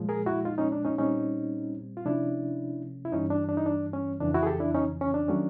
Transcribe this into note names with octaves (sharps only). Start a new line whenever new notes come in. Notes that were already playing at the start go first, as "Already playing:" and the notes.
Already playing: A#2 F3 G#3
G#4 A#4
E4 F#4
D#4 F4
C#4 D#4
D4
C#4 D#4
A#2 G3 C4 C#4 D#4
F4
C3 F3 A3 C#4 D4 E4
E4
G2 E3 G3 C#4 D#4
D4
D4
D#4
D4
C#4
F2 C#3 E3 D4
E4 F#4
G#4
G4 A4
D4 E4
C#4 D#4
C#4
D4
D#3 F#3 A3 C#4